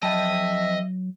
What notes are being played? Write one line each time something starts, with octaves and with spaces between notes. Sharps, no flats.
F2 F#3 D#5 E5 G5 A5